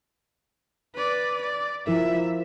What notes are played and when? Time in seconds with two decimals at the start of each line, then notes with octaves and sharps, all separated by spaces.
0.95 B4 D5
1.41 D5
1.87 F3 E4 A#4 E5